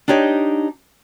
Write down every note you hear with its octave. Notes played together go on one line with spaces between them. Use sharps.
D4 D#4 G4 C#5 D#5